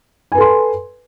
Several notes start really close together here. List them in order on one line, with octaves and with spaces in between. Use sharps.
G#5 B4 A4 C6